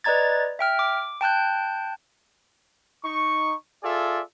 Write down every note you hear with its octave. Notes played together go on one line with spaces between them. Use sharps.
B4 D5 D#5 A#5 G#6 A6
E5 G5 F6
D6
G5 A5 F#6 G6
D#4 C#6
F4 G#4 A4 D5 E5